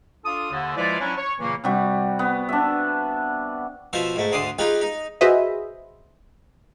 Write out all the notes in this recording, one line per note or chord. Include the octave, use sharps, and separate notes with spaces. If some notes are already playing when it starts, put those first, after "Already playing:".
D4 F4 A4 F5 D#6
D#2 D3
F3 G#3 E4 F4 B4 D5
F#3 C#4 D4 E4
C#5
A#2 C#3 E3 F#3 A#3
C3 G3 F#4
B3
D4 E5
B2 F3 C5 E5
G#2 A3
D2 D3 C6 D6 D#6
D#4 F4 G4 G#4 B4
D#4
F#4 G#4 B4 C5 D#5 E5